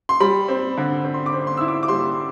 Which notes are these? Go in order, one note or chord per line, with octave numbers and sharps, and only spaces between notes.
C6
G3 B5
C4
D3
C4
C6
D6
C4
C6
E4 E6
D6
D6
G3 C6